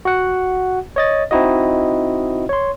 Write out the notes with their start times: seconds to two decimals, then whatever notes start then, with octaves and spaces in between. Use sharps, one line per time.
0.05 F#4 F#5
0.96 C#5 D#5 A6
1.31 C4 D#4 E4 F#4 D#5
2.49 C#5 C6